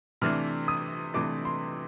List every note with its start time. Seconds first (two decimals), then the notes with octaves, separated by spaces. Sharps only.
0.22 C3 E3 A3 D4 F6
0.68 D#6
1.14 C3 E3 A3 D4 D6
1.45 C6